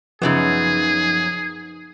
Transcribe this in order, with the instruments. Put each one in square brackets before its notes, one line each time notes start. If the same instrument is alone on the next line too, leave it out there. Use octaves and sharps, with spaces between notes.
[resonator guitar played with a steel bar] F#2 C#3 B3 [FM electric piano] F3 D#4 [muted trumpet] G#4